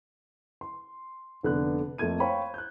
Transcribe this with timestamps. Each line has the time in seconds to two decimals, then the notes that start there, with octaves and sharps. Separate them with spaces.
0.61 C6
1.43 F1 D3 B3 F#6
1.98 F2 A3 A#3 G#6 D#7
2.20 C5 C#5 F5 G5 B5 C#6
2.54 F#6 G6